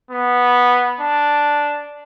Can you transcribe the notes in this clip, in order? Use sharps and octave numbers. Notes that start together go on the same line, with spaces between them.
B3
D4